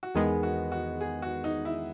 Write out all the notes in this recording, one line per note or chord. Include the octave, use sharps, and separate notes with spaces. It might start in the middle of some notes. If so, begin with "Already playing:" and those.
F#4
E2 D#3 G#3 B3 G#4
F#4
F#4
G#4
F#4
D#4
E4